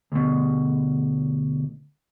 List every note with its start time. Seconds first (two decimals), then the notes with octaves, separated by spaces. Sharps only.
0.12 D2 B2